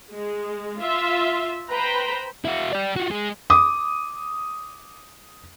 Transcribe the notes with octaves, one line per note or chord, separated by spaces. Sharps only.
G#3
F4 E5
B4 C5 G5 A#5 B5
E4 F#4
G4 D5
F4 F#4
G#3
D6 D#6